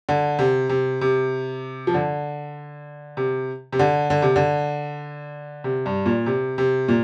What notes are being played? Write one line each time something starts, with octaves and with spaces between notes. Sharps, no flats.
D3
C3
C3
C3
F3
D3
C3
C3
D3
D3
C3
D3
C3
G2
A#2
C3
C3
A#2